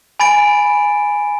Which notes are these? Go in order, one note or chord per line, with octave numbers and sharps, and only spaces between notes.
G#5 B5 A6 D7